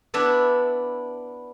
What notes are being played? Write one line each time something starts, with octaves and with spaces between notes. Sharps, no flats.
B3 D4 E4 E5